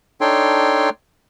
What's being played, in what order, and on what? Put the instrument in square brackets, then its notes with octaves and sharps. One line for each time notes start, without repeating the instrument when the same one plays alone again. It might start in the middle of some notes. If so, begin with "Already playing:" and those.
[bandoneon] D4 D#4 A4 C#5 G5 C6